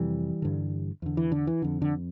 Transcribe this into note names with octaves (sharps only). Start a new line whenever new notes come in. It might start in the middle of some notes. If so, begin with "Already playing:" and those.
Already playing: F2 C3 E3 G3
G2 D3
E2 D3
E3
D3
E3
F2 D3
D3